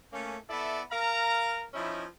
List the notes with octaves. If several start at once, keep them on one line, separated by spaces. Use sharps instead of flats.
A3 A#3 C#4
B3 E4 A4 D5 E5
A#4 F5 A#5
F3 C#4 D#4 E4